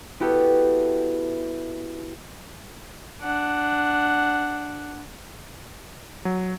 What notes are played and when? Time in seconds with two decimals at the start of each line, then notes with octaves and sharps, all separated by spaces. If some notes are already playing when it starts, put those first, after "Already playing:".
0.20 B3 E4 F#4 G4 A4
3.22 D4 F#5
6.25 F#3